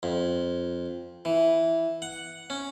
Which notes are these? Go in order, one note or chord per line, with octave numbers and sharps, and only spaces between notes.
F2
E3
F#5
C#4